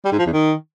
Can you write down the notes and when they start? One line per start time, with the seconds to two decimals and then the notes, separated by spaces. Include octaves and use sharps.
0.05 G3
0.12 G#2
0.19 F3
0.26 E2
0.33 D#3